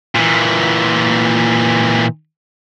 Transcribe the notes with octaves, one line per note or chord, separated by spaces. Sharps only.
A#2 E3